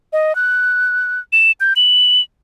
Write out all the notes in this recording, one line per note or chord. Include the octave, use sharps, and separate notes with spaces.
D#5
F#6
E7
G6
F#7